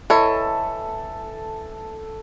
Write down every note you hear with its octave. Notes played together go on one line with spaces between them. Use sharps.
E3 A4 C#5 D#5